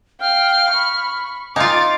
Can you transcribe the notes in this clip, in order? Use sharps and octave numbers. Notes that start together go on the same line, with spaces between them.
F5 G5 F6
B5 C#6
D#4 F4 F5 G#5 C6 D6 A6